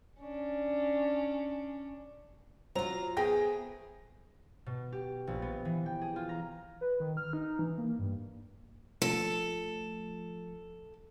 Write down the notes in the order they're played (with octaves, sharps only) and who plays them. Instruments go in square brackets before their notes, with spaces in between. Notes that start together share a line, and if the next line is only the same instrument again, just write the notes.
[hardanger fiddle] C#4 D4
[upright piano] F#3 [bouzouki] F4 A#5 [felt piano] C5
[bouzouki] A3 B3 [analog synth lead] G#4 [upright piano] G5 A#6
[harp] B2
G4
A#1
B3
E3
G5
G#4
F4
A#5
[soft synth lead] B4
D#3
F6
D#4
E3
A#3
G2
[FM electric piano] F3 A3 [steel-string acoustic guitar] A4